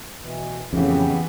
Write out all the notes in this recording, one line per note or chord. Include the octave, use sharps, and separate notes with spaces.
B2 E3
F2 A2 C#3 E3 B3 G4